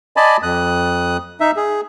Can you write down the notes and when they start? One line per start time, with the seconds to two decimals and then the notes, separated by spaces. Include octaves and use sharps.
0.16 D5 D#5 G#5 A5 B5
0.43 F2 D#6 F#6
1.40 D#4 E5
1.57 G#4